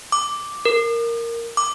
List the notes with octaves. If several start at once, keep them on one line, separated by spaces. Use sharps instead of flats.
D6
A#4
D6